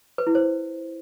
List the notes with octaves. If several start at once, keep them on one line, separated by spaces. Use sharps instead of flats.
B4
E4
C5